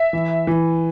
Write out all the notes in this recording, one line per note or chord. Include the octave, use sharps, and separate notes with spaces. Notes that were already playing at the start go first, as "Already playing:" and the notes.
Already playing: E5
E3
E3